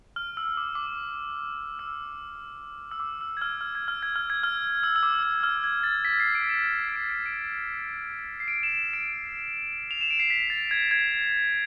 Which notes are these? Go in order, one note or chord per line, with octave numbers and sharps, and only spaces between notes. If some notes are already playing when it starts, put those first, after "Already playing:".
F6
E6
D6
D6
E6
E6
D6
E6
G#6
F6
F6
G#6
F6
G#6
F6
G#6
F6
E6
E6
D6
E6
F6
G#6
A6
B6
C7
D7
E7
C7
D7
D7
C7
D7
E7
D7
F7
E7
D7
C7
B6
A6
G#6
G#6